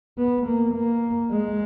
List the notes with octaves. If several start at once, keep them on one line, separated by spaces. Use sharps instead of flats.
B3
A#3
A#3
G#3